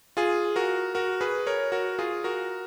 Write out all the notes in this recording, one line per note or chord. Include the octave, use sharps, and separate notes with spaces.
F4 G#4
F#4 A#4
F#4 A#4
G#4 B4
A#4 C#5
F#4 A#4
F4 G#4
F#4 A#4